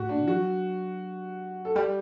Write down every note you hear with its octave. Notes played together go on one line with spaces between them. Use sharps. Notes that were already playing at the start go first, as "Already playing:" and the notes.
Already playing: A2 F#4 G4
D4
F#3 F#4
A4
G3 G4